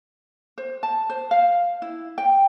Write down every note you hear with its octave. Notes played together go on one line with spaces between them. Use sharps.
C5
A5
C5
F5
E4
G5